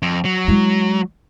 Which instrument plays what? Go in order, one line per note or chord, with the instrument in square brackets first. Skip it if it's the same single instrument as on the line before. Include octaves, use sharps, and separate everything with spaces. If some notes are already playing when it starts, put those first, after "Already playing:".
[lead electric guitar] F2
F#3
[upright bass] G#3 E4